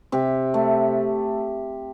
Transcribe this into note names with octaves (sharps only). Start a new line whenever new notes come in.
C3 G4
A3